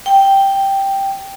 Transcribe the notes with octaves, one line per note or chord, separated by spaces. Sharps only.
G5